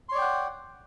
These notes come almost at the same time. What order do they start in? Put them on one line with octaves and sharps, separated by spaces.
C6 C#5 D5 G5 F#5